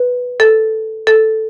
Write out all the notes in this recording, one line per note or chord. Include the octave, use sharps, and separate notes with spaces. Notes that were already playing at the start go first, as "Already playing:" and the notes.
Already playing: B4
A4
A4